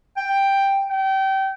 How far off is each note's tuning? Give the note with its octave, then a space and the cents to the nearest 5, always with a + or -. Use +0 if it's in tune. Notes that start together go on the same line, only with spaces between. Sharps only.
G5 +5
G5 -25